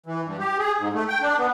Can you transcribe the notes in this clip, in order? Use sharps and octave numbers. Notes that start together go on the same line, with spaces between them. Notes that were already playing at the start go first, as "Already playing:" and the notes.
E3
G2
G4
G#4
G#2
A3
G5
D4
B3